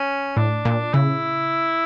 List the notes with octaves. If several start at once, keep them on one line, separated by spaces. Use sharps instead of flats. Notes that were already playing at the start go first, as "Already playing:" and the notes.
Already playing: C#4
A2 D4
A#2
C#3 E4